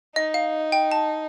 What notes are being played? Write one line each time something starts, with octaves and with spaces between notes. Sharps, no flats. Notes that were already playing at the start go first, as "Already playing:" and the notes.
D#4 D#5
F5
G5
A5